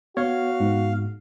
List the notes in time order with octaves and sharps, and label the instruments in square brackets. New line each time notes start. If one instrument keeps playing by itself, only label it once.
[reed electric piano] B3 [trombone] F#4 [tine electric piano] C#5 [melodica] F5
[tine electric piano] G#2